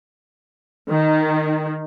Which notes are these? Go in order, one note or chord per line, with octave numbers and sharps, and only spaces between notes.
D#3